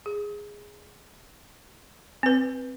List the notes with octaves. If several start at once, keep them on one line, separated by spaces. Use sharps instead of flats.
G#4
C4 B4